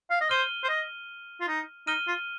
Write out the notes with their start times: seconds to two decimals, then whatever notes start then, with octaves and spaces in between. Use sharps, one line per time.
0.10 F5
0.21 D#5
0.29 C5 F6 D#7 G7
0.64 C5
0.69 D#5
1.41 F4
1.48 D#4
1.87 D#4 F6 D#7 G7
2.07 F4